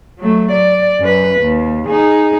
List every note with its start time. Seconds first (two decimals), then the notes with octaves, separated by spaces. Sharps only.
0.19 F#3 A3
0.52 D5
1.00 F#2 B4
1.41 D#2
1.86 D#4 G#4